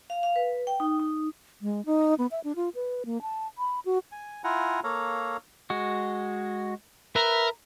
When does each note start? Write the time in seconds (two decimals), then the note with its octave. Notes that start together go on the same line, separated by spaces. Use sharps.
0.10 F5
0.23 F5
0.36 B4
0.67 G5
0.80 D#4
1.00 D#4
1.62 G#3
1.86 D#4
2.18 B3
2.31 E5
2.44 D4
2.56 F4
2.75 B4
3.06 A#3
3.22 A5
3.58 B5
3.85 F#4
4.12 G#5
4.44 E4 F4 F#5 G#5 A#5
4.84 A#3 A4 C#5 F5 A#5
5.70 G#3 F#4
7.16 A#4 B4 E5